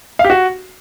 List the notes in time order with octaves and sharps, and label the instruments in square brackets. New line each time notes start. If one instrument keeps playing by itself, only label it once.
[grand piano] F5
G4
F#4